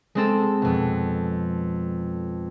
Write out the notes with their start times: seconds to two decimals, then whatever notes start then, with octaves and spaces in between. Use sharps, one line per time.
0.15 G#3 C4 A4
0.62 F2 B2